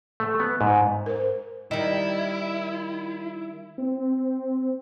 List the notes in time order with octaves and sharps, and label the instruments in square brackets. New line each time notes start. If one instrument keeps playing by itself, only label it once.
[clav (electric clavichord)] A3
B3
G#2
[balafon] A#4 C5
[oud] D#3 G3 [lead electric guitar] E4 [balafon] D#5
[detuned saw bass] C4